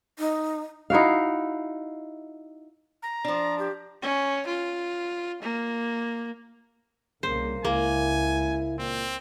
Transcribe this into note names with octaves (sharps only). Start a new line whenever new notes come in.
D#4
D#4 E4 F#4 F5
A#5
F3 D4
G4
C#4
F4
A#3
C2 C#3 A#3 C5
C#2 A#3 E4 G#5
A#2 C4